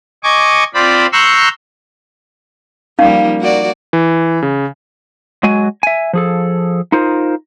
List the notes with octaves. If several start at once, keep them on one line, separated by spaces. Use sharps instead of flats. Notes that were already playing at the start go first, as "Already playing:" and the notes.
D#5 G#5 C#6 D6
C4 F4 C5 D5 B5
A#5 C6 C#6 E6 F#6 G6
F3 G3 A#3 C#4 D#4 F5
A#3 F#4 D5
E3
C#3
F#3 G#3 F#4 G#5
E5 G#5
F3 G#4 A4
D#4 F4 A#4 C5